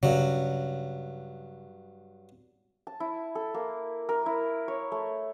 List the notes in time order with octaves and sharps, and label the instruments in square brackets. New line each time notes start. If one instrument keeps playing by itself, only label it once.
[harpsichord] G2 F#3 [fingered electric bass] C#3
[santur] A5
E4
A4
A#3
A#4
E4
C#5
A3